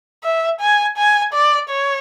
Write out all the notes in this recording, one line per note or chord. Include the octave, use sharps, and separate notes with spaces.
E5
G#5
G#5
D5
C#5